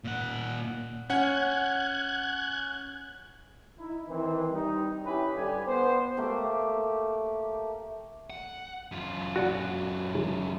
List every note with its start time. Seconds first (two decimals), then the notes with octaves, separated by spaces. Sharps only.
0.04 A#2 F#5
1.10 C#4 F#5 F#6 G#6
3.79 D#4 E4
4.09 D#3 E3 C4
4.51 G3 D#4
5.05 C#4 E4 G4 B4
5.36 G2 D3 G3 G4 G#5
5.66 B3 C5
6.17 A3 A#3 G4
8.30 F#5
8.92 F#2 F4
9.36 F#4 D5 F#5